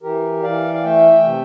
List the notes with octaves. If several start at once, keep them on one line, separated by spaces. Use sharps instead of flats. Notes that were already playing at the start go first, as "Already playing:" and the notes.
E3 G4 A#4
E3 D5 F5
F5
A3 E5 G5
C3